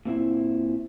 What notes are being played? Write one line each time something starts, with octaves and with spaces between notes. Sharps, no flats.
A#2 C4 E4